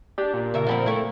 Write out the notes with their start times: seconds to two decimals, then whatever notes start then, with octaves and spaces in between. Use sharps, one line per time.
0.18 D4 G4
0.34 A#2
0.54 C#3 A#4 E5
0.66 D3 F3 C4 F5 B5
0.86 A3 E4